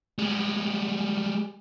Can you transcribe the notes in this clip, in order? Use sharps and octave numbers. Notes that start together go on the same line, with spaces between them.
G3 G#3